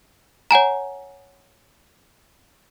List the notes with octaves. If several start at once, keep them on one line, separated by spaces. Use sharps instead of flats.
C#5 F#5 G#5 A#5